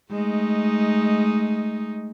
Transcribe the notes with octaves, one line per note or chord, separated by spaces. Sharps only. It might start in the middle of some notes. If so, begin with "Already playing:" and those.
G#3 A3 D#4